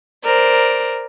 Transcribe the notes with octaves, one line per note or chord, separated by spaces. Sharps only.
A#4 C5 D5